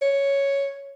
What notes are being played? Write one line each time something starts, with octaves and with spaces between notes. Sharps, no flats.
C#5